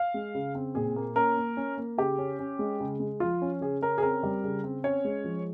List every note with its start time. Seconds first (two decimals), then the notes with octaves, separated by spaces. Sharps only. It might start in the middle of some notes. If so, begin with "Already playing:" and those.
Already playing: F5
0.14 G#3
0.35 C#3
0.55 C4
0.75 A#2 G#4
0.96 A#3
1.16 C#4 A#4
1.36 A#3
1.57 C#4
1.78 A#3
1.98 C#3 G4
2.18 C#4
2.39 C#4
2.59 G#3
2.80 C#3
3.00 G#3
3.20 F3 F4
3.42 C#4
3.61 C#3 G#4
3.82 C#4 A#4
3.98 G#4
4.02 C4 A#4
4.23 G3
4.44 C#3
4.64 C4
4.84 C#4 C#5
5.05 G#3
5.24 F3